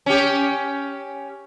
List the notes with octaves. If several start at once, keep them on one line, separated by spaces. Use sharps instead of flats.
C#4 G4